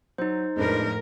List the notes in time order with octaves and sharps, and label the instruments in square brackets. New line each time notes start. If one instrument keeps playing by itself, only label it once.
[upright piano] F#3 [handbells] D#4 C5
[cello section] F2 A2 A#4 [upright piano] G#3 D4 B4